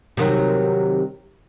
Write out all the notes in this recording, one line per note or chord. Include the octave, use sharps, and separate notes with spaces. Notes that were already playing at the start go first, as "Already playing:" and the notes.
C3 D#3 F#3